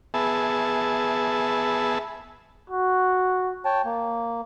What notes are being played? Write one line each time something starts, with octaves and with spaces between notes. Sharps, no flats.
B3 G#4 E5 A5
F#4
C#5 G5 A5
A#3